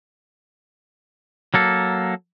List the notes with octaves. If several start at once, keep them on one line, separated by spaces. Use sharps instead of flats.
F#3 A#3 A4